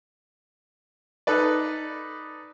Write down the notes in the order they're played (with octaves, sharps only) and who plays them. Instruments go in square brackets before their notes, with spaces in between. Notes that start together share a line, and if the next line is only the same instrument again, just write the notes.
[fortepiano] D#4 A4 B4 D5